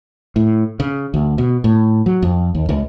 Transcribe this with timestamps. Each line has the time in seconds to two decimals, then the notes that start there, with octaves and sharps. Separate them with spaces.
0.36 A2
0.80 C#3
1.14 D2
1.38 B2
1.64 A2
2.06 F#3
2.22 F2
2.55 D#2
2.69 C#2